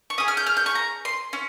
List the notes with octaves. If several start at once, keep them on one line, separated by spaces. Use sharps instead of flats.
C#6
C#4 G#4 D#6
F6
G6
F6
G6
C#6
A#5
C6
C#4